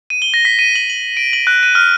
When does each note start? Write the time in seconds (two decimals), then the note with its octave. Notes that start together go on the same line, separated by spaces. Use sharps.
0.10 D#7
0.22 G7
0.34 A#6
0.45 B6
0.59 D#7
0.76 F#7
0.90 F#7
1.17 D7
1.33 F#7
1.47 F#6
1.63 D#7
1.75 F6